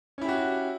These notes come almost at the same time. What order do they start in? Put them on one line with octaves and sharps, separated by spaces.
C#4 E4 G4 F#4